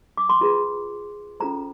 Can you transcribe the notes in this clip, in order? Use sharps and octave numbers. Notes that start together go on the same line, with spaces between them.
D6
C6
F4 G#4 B4
C#4 F4 A4 C5 A#5